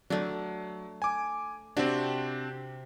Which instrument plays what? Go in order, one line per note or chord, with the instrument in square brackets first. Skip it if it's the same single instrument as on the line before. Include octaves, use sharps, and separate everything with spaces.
[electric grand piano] F#3 [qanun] A3 D4
[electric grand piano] G#5 D6
[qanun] C3 F#4 G4 [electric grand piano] C4 D4